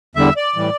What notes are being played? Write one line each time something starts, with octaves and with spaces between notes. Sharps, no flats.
E2 D3 G3 E5
D5
A2 E3 G3